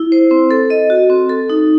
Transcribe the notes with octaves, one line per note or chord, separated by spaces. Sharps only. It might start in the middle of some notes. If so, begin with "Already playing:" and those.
Already playing: E4
C5
C4
A4
D#5
F#4
C4
A4
D#4